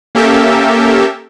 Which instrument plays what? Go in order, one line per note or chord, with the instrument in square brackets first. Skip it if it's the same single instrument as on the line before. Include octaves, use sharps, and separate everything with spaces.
[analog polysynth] A#3 C#4 G4 A4 A#4 E5